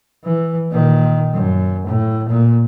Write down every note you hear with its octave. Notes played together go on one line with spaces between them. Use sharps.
E3
A#2 D#3
F#2
A2
A#2